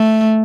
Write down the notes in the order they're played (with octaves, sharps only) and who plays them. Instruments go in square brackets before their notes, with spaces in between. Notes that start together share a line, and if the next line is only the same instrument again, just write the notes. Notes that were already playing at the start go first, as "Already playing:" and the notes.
Already playing: [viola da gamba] A3